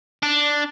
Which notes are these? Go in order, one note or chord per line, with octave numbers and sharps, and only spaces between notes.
D4